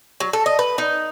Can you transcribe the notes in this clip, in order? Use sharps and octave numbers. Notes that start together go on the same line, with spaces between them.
F#3
A4
D#5
B4
D#4